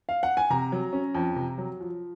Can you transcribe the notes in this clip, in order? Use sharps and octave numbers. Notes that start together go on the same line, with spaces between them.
F5
F#5
G#5
C3 A#5
F#3
C#4
F2
C3
F#3
F3